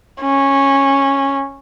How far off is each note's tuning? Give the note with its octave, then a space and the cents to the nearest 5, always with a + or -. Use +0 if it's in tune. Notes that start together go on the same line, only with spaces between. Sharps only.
C#4 -10